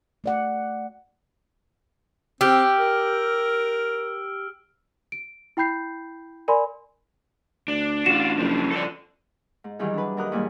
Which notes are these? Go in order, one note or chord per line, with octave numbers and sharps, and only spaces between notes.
A3 D5 F#5
C4 G4 E6 F6 D7
A#4
D7
E4 G5 B5 G6 C7
A#4 D5 G#5 B5 C6
D2 D4
A1 F4 F#4 E7
F#1 G2 F3
A4 D5
G#2
D#3 E3 F#3 G3 D#4 G#4
D4 B4
D#2 F#3 A#4 D#5 D#6 F#6
E2 G#2 G3 A#3 G#5